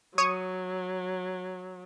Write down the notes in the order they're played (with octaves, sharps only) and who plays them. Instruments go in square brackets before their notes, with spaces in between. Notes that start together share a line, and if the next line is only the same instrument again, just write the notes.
[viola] F#3 [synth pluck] C#5 C#6 D#6